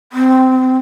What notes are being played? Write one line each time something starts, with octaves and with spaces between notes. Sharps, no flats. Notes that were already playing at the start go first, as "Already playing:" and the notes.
C4